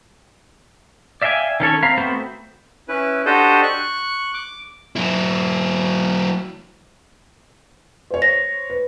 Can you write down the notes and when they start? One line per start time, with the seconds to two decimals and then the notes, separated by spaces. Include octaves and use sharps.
1.22 D5 E5 F5 G5 G#5
1.60 D#3 C#4 A4 C#5
1.83 C4 F5 A#5 B5
1.97 A3 B3 C4 F#4 G5
2.88 C#4 E4 B4
3.26 D4 F#4 G4 A4 C5 D#5
3.63 C#6 F#6
4.34 D6
4.96 F#3 E4
8.11 C5 C#5
8.22 A#6
8.70 B4